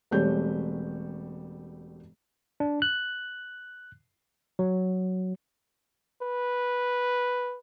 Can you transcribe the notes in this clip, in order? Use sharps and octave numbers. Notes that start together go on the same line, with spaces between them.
E1 G3 A3 C4 C#5 G6
D4
F#6
F#3
B4